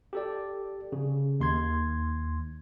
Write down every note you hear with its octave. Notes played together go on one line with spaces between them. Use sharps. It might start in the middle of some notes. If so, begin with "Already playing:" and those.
G4 A4 D5
C#3
D#2 C6 G#6